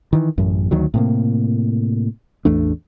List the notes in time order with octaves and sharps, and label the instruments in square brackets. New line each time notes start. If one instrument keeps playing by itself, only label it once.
[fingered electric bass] D#3 E3
A1 F#2
D2 D#3 F#3
A2 C3 A#3
A1 E2 A3 D4